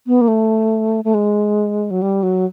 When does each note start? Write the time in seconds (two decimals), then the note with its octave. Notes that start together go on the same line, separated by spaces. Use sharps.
0.07 B3
0.21 A#3
0.28 A3
1.04 A3
1.14 G#3
1.91 F#3
2.02 G3
2.23 F#3